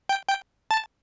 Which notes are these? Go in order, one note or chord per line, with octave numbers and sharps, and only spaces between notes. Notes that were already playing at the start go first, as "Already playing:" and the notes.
G5
G5
A5